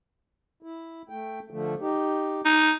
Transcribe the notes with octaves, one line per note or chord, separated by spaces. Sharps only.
E4
A3 G5
D3 F3 A3
D#4 G4
D#4